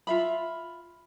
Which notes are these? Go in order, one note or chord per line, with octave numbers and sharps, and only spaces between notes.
F4 E5 B5